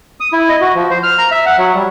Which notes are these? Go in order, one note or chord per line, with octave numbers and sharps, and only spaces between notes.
D#6
E4
D#5
F#4
F3
C5
F6
A#5
E5
F#5
F#3
G3